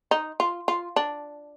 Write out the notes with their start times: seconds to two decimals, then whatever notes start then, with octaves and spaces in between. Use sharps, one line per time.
0.11 D#4
0.40 F4
0.68 F4
0.96 D4